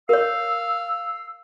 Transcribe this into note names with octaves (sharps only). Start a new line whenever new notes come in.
A#4 C#5 F5 E6